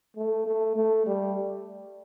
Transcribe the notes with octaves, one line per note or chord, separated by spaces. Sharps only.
A3
A3
A3
G3